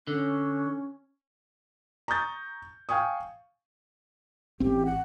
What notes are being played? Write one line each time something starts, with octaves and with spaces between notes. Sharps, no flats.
D3 C#4
A#5 C#6 D#6 G6 A6
F5 G5 G#5 C#6 D#6
A1 C4 G4
F#5